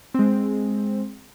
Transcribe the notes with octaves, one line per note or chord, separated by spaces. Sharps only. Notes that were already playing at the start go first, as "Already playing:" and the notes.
G#3 C4